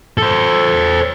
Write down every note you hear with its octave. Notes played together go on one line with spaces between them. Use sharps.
A4 C5